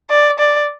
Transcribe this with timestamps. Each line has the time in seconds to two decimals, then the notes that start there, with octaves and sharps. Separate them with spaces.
0.10 D5
0.39 D5